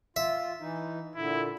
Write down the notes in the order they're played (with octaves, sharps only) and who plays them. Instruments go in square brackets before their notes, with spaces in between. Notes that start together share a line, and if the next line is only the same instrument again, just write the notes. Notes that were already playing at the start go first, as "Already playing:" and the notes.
[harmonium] F4 [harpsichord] E5
[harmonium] E3 D#4
[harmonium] A#2 D3 [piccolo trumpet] E4